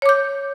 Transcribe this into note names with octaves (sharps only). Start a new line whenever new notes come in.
C#5 D6 G6